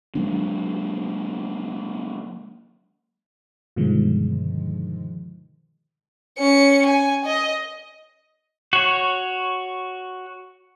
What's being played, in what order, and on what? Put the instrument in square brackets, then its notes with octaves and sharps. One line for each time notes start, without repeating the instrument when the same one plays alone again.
[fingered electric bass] F#3 G#3 A#3 D4
[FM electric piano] G2 B2 D3 D#3 F3 G#3
[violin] C#4 C#7
G#5
D#5
[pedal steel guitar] F#4 C#5